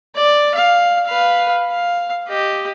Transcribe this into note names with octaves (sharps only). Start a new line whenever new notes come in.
D5
F5
B4 F5
F5
G4 D#5